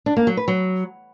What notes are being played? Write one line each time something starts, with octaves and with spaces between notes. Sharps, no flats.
D4
A#3
F#3
B4
F#3